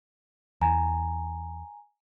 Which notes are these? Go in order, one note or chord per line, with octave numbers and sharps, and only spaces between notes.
E2 E3 G#5 A#5